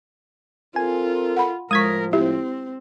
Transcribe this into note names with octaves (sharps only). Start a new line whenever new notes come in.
C4 F4 A4 A#4 G#5
F#5 B5
A2 F3 G#3 A#4 C#6 D#6 G#6 B6
C4 E4 G4